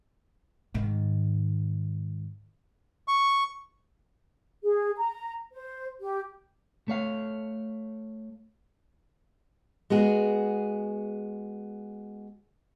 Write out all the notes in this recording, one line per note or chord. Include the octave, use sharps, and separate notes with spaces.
G#2 D#3
C#6
G#4
A#5
C5
G4
A3 C#5 F5
G#3 B3 F#4 G#4